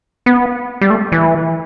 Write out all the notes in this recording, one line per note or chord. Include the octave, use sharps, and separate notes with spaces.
B3
G3
A3
E3